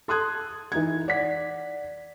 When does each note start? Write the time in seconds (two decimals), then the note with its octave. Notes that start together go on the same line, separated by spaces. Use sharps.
0.08 A4 C6 D#6 F#6 G#6
0.72 E3 D#4 G#6
1.08 D5 F#5 B6